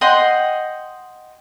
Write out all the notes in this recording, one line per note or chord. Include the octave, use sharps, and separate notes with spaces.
D#5 F#5 G5 C6